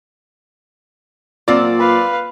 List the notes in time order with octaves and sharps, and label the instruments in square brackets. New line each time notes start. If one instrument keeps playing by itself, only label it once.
[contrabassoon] A#2 [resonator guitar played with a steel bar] F#3 C4 F4 [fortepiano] D5
[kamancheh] B4 F5